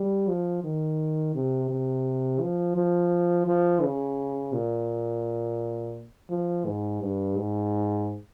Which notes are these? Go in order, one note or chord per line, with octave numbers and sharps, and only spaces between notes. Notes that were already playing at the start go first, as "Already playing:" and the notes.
Already playing: G3
F3
D#3
C3
C3
F3
F3
F3
C#3
A#2
F3
G#2
G2
G#2